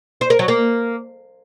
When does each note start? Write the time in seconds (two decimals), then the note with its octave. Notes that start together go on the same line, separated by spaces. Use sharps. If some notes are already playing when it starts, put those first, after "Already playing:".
0.21 C5
0.30 A#4
0.39 F#3
0.48 A#3